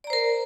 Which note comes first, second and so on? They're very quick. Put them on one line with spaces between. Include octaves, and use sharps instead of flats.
D5 A#5 C5 A#4